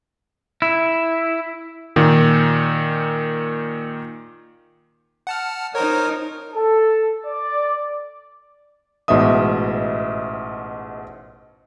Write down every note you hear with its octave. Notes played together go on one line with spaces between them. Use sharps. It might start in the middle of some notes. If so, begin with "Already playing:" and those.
E4
A#2 D#3
F#5 A5 F6
D#4 A#4 C5 C#5 D#5
A4
D5
A1 G#2 B2 D#5 E5 D#6